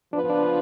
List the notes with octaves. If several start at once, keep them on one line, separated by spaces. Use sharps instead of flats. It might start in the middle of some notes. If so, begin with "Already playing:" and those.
F3 B3 D4 F4 B4
D4